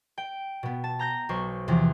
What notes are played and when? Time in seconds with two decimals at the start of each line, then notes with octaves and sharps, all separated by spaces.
0.18 G5
0.63 B2 B3
0.84 A5
0.99 A#5 G6 A#6
1.29 B1 C5 C#6
1.68 E2 C3 E3 F3